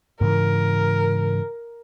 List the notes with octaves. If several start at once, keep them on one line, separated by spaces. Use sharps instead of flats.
G#2 C#3 E3 A#4